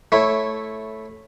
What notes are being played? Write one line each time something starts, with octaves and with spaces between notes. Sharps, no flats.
A3 E4 C#5